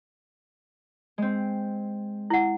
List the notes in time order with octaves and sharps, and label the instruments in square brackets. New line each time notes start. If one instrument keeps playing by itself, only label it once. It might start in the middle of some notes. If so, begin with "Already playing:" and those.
[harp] G#3 C4
[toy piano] E4 F#5